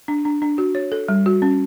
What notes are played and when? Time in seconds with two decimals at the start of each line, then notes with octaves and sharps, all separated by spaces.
0.08 D4
0.25 D4
0.42 D4
0.58 F#4
0.75 C#5
0.92 A4
1.08 G3
1.26 F#4
1.42 C#4